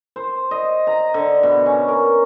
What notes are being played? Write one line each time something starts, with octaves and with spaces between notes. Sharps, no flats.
C5
D#5
A#5
D3
B2
C#4
A#4